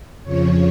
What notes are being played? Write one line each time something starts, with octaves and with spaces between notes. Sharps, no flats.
F2 C#3 F3 C#5